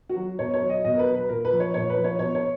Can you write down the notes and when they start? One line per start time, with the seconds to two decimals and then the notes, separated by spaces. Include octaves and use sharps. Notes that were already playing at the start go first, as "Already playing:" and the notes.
0.09 F#4
0.16 F#3
0.39 B2 C#5
0.54 C#5
0.62 F#3
0.69 D#5
0.85 B2 D#5
0.94 A#4
0.99 B4
1.07 F#3
1.14 B4
1.29 A#2 A#4
1.45 B4
1.52 F3
1.60 C#5
1.74 A#2 C#5
1.90 B4
1.97 F3
2.04 C#5
2.19 B2 C#5
2.35 C#5